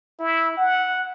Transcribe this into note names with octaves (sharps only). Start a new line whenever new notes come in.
E4
F#5